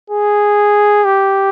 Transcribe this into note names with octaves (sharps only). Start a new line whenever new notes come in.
G#4
G4